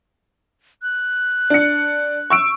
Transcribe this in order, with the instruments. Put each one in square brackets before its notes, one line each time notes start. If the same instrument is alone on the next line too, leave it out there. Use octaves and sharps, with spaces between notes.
[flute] F#6
[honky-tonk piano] D4 C#7
C#6 E6 D7